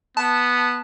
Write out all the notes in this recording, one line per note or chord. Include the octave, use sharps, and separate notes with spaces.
B3 A5